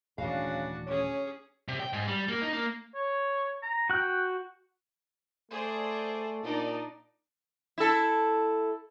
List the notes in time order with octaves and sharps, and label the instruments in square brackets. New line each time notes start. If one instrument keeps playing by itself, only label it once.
[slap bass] D#1 E3 A3 [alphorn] C#3 [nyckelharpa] D4 F#4 [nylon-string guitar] F5
[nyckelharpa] C#4 G#4 [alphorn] C#5
[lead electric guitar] C3
G5
G#2
G3
A#3
D#4
A#3
[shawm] C#5
A#5
[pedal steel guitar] F#4 F#6 [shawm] G5
[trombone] A3 [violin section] G#4 C5 D5
[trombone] A#2 [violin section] D4 D#4 D5
[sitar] E4 A4